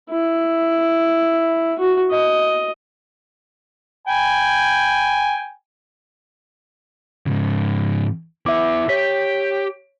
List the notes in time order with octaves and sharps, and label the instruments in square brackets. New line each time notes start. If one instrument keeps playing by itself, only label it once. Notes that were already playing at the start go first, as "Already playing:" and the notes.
[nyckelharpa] E4
F#4
D#5
[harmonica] G5 G#5 B5
[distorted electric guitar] G#2 C#3
[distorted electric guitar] B3 E4 [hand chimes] E5 D6
[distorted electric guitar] G4 [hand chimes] C#5 B6